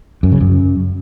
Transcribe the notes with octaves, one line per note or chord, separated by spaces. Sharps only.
F#2
C#3
F#2